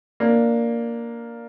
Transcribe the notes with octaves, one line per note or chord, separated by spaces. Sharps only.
A#3 D4